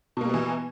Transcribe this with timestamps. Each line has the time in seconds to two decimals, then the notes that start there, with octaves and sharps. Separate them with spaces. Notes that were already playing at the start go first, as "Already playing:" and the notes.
0.17 B2
0.21 A#3
0.25 G3
0.29 B3
0.34 E3